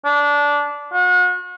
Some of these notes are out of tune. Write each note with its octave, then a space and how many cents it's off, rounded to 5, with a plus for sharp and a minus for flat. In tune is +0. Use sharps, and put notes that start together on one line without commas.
D4 -15
F#4 -40